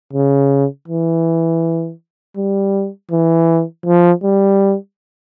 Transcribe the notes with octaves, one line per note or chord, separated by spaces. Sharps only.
C#3
E3
G3
E3
F3
G3